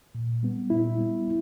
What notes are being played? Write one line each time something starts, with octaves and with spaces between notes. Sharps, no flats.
A#2
G3 B3
A#2 E4
G3 B3